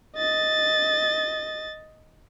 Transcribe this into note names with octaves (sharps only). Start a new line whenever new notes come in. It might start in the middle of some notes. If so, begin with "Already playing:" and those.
D#5 A6